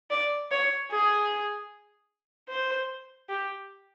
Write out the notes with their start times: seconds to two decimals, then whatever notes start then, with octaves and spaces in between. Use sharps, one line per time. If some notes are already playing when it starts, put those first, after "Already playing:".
0.11 D5
0.51 C#5
0.91 G#4
2.49 C5
3.29 G4